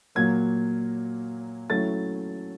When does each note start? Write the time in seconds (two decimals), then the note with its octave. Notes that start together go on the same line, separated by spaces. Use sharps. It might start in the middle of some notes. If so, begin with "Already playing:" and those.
0.15 A#2 F#3 A#3 G#6
1.70 F#3 A3 C#4 E4 A6